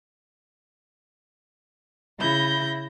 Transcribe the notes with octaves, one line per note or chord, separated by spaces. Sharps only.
C#3 E4 B5 G6 A#6